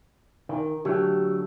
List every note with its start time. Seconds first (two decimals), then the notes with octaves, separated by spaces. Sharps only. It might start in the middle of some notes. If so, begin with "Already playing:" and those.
0.49 D#3
0.85 D3 F#3 A3 G4